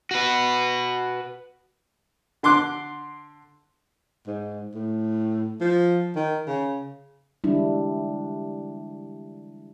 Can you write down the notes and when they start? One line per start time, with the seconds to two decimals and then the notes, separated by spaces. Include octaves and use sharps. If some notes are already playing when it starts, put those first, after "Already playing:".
0.11 F#4 B4
2.43 D3 C6 D6 F#6
4.27 G#2
4.74 A2
5.61 F3
6.16 D#3
6.46 C#3
7.44 D3 E3 G3 G#3 D4 E4